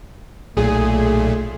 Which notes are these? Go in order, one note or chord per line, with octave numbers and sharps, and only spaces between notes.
B1 A#2 A3 G#4